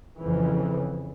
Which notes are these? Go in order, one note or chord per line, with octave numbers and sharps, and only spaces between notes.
F2 C#3 E3